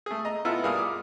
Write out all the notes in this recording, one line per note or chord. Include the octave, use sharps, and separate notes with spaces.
A3 G#4
D#5 A#5
B3 E4 F4 A4 B4
G2 G3 G#4 A#4 F5 D#6
D6